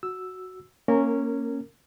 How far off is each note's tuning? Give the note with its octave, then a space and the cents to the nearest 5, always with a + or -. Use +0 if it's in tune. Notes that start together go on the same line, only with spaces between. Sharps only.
F#4 +0 E6 +0
A#3 +0 C#4 -5 A#4 -20